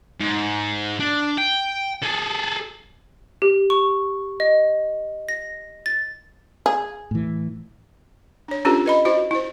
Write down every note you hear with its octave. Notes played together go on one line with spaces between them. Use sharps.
G#2
D4
G5
G#4 A4
G4
C#6
D#5
A#6
A6
G#4
A2 E3
D4 C#5
C#4 D4 F4 G4 A4 B4
B4 D#5 B5
E4 F#4 C5 D#5
E4 C5